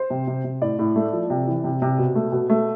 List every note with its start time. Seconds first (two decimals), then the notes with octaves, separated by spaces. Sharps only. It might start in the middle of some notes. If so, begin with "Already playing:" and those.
Already playing: C5
0.10 C3
0.27 C3
0.44 C3
0.62 A2 D5
0.79 A2
0.96 A3
1.13 F3
1.30 C3
1.47 E3
1.64 C3
1.82 C3
1.98 B2
2.15 A3
2.32 B2
2.50 A3